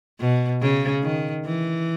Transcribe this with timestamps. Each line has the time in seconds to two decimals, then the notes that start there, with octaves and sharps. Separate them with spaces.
0.20 B2
0.61 C#3
1.03 D#3
1.45 E3